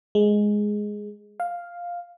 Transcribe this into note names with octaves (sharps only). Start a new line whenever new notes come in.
G#3
F5